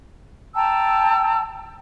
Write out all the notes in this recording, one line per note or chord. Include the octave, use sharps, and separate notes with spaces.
G5 A5 A#5 E6